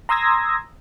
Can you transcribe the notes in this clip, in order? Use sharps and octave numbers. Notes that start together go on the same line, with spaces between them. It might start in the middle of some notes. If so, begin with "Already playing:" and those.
A#5 C6 D#6 E6 G#6 A#6